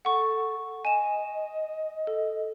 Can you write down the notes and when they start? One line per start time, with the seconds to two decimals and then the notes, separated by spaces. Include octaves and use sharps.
0.05 A4 F#5 C#6
0.85 D#5 G#5 E7
2.07 A4